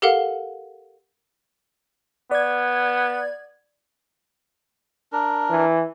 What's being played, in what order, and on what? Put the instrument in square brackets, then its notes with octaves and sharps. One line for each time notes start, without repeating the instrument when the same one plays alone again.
[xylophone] G4 A4 A#4 F5 F#5
[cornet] B3 [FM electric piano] D5 G#6
[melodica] D4 A#4
[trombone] E3